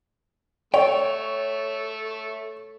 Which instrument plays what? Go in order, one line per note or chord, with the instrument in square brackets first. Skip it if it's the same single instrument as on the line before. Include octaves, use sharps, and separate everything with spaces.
[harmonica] A3 [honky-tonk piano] C#5 [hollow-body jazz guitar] G5